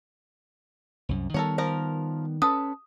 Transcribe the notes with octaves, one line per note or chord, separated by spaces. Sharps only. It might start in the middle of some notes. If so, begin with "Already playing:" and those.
C2 F#2
D#3 G3 B3 A4 A#4 C#5
F3 A#4 A#5
C#4 A4 B4 D#6